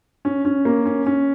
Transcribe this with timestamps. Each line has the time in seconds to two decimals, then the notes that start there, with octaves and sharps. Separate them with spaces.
0.25 C#4
0.45 C#4
0.65 A#3
0.85 C#4
1.06 C#4